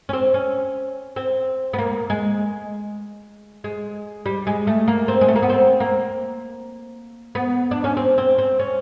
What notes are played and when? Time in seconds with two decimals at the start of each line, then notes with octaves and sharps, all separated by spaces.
0.09 C#4
0.13 C4
0.34 C#4
1.16 C4
1.73 B3
1.78 A#3
2.10 G#3
3.64 G#3
4.26 G3
4.47 G#3
4.67 A3
4.88 A#3
5.08 C4
5.21 G#3
5.28 A3
5.36 A#3
5.42 B3
5.50 C4
5.80 A#3
7.35 B3
7.71 D4
7.84 C#4
7.97 C4
8.18 C4
8.38 C4
8.59 C#4